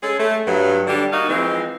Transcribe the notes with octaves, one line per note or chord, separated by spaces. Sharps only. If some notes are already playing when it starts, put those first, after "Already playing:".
G#3 C#4 G#4 A4
A3
G2 F#3
D3 G3 D4
A#3 D#4 F#4 F5
E3 F3 G#3 C4